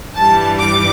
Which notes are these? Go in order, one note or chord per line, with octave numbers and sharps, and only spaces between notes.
G2 E3 G3 A5
D6